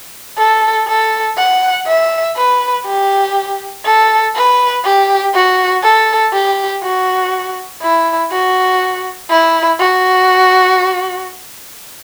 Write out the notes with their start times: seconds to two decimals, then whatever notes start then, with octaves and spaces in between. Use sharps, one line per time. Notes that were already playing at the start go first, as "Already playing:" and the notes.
0.38 A4
0.88 A4
1.37 F#5
1.87 E5
2.36 B4
2.86 G4
3.85 A4
4.35 B4
4.84 G4
5.34 F#4
5.83 A4
6.33 G4
6.83 F#4
7.82 E4
8.32 F#4
9.30 E4
9.80 F#4